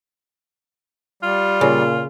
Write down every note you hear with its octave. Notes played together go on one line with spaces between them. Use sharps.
G3 F4
A#2 C#3